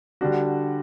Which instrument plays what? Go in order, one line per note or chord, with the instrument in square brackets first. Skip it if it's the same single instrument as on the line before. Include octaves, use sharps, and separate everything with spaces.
[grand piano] D3 G3 D4 F#4